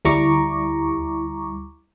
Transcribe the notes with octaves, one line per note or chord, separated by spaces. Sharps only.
D2 G3 E4 A#5 C#6 D6